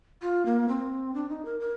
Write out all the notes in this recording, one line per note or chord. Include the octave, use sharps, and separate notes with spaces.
F4
A#3
C4
D4
D#4
A#4
A#4